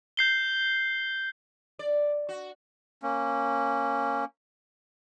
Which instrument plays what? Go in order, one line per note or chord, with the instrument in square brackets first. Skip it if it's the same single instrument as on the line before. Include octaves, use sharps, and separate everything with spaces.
[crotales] G6 C7 G7
[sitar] D5
F#4
[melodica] A#3 C#4